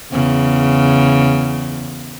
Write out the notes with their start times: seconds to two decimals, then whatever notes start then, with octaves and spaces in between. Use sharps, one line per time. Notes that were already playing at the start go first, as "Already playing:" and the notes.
0.12 E2 C#3